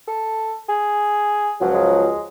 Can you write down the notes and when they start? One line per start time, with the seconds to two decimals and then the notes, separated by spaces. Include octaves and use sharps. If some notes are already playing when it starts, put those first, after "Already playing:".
0.08 A4
0.69 G#4
1.61 C#2 F3 F#3
1.74 G#3